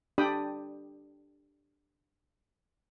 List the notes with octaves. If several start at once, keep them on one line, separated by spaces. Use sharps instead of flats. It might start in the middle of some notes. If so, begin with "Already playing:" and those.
D4 G4 D5 G5 B5 D#6